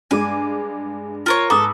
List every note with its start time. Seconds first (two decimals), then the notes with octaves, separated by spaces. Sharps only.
0.11 G2 G#3 G#5 D6
1.26 F4 A#4 C#5
1.50 G#2 A4 B4 A#5 D6 D#6